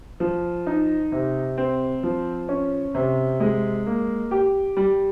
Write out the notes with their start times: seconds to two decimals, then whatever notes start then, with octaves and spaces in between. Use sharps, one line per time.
0.20 F3
0.67 D#4
1.12 C3
1.57 C4
2.03 F3
2.49 C#4
2.95 C3
3.40 G#3
3.86 A#3
4.31 G4
4.77 G3